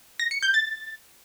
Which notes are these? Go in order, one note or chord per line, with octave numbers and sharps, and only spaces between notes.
A#6
C#7
G6
A6